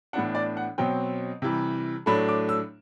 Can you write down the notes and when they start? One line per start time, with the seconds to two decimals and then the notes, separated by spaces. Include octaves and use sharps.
0.13 A2 E3 B3 D4 F#5
0.35 D5
0.57 F#5
0.78 B2 F#3 C4 G5
1.42 C3 E3 G3
2.06 A2 F#3 A3 D4 B5
2.29 D6
2.49 E6